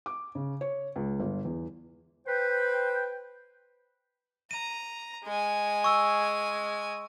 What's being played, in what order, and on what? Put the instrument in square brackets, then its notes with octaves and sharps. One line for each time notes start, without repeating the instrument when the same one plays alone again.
[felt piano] D6
C#3
C#5
C#2
G1
E2
[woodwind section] B4 C5 G5
[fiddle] A#5 [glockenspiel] D#7
[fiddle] G#3 G#5
[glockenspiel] C#6 E6